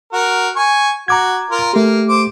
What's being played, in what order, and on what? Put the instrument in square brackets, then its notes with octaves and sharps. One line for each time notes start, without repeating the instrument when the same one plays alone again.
[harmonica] F#4 A#4
G#5 C#6
[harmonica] F#4 [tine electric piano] A#5 D6 G#6
[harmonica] F4 A#4
[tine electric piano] A3 G4 [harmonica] A#3
[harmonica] C5 D6